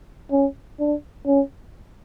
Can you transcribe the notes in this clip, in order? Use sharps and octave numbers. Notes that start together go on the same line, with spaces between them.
C#4
D4
C#4